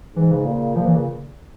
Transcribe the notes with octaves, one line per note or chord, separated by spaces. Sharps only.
G#2 E3
C#3
A#2
A#2 F3
E3
C#3